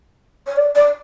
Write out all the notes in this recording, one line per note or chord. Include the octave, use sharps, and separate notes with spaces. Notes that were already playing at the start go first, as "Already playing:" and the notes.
C#5
D5
D5